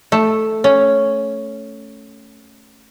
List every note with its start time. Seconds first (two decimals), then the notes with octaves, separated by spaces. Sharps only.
0.12 A3
0.64 C#4